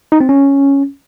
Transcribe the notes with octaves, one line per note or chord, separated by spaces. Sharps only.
D#4
C4
C#4